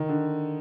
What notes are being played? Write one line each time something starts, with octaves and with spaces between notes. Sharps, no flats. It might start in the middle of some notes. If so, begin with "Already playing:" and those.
Already playing: D#3
D3